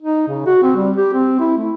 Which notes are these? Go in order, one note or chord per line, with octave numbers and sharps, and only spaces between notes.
D#4
C#3
F#4
C4
G3
G4
C4
E4
A3